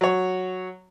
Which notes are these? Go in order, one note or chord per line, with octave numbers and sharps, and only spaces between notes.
F#3 C#5